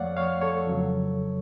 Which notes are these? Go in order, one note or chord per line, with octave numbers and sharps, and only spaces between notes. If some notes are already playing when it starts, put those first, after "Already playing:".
Already playing: F2 F3 A3 C#5 D5 F5 F#5
C#5 F5
A4 C#5
F2 C#3 F#3